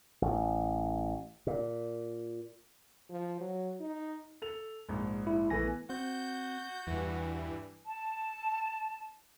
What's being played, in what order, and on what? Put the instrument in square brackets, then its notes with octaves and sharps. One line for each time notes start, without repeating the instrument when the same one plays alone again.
[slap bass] A1
A#2
[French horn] F3
F#3
D#4
[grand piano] A4 F7
A#1 G#2
[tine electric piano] E4
[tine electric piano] A#1 G#5 A#6 [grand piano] E3 A3 B3
[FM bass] C4 [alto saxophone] F#4 [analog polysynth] G6
[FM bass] E2 [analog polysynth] G2 E3
[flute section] A5